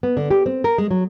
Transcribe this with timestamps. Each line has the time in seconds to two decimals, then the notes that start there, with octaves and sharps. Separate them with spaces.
0.03 B3
0.17 D3
0.31 G4
0.46 C4
0.64 A#4
0.78 G#3
0.91 F#3